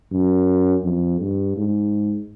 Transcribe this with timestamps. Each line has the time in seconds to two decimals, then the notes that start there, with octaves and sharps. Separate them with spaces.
0.12 F#2
0.84 F2
1.20 G2
1.57 G#2